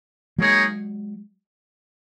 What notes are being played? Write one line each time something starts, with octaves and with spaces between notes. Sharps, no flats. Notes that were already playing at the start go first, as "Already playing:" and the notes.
F#3 G#3 A#3 D#4 G#4 C#5